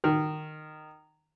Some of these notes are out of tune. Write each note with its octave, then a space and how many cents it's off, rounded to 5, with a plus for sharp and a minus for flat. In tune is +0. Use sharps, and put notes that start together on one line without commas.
D#3 -15